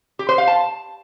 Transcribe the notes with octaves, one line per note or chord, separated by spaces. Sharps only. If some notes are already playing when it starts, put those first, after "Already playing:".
G4
C5
F5
A5